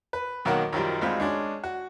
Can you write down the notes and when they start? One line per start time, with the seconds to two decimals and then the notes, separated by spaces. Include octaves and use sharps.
0.13 B4
0.45 B1 D#3 F#3 A#3 F#4 F#5
0.73 F#2 D#3 F3 G3
1.01 D2 G#3 C4 D#4 F4 B5
1.20 G#3 C#4 D4
1.64 F#4